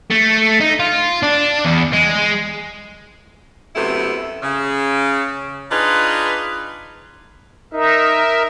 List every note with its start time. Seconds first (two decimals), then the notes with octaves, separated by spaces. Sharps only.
0.10 A3
0.60 D#4
0.80 F4
1.23 D4
1.65 E2
1.93 G#3
3.76 F#2 C3 A3 B3 C4 E4
4.43 C#3
5.71 D4 D#4 F4 G#4 B4 D#5
7.73 D#4 A#4 E5